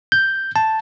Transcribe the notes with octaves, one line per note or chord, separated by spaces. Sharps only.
G6
A5